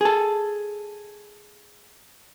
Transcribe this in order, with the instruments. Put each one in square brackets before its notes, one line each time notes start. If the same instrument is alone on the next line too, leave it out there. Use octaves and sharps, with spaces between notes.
[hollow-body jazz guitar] G#4 A4